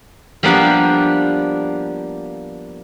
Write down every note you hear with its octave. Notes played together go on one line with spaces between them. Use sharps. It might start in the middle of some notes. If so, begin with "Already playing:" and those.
F3 G3 A#3 B3 D4 G4